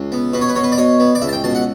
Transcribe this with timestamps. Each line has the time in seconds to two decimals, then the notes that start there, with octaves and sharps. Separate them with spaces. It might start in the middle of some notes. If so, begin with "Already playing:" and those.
Already playing: C#2
0.12 B3
0.33 B2 B4
0.41 C#5
0.49 B4
0.56 B2 C#5
0.64 B4
0.72 D5
0.78 B2 C#5
1.00 B3
1.15 D5
1.22 C#2 E5
1.28 A5
1.33 G5
1.44 B2 A5
1.55 F#5